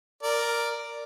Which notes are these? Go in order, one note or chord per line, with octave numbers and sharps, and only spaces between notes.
A#4 D5